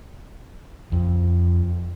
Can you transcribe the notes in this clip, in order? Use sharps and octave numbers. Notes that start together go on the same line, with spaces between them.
F2